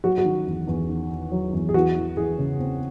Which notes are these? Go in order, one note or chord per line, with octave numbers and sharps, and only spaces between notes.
F#3 F#4
F#4
D#3
E2
E2
D#3
D#3
F#3
E2
G#4
E3 F#4
E3
E3 G#4
C#3
C4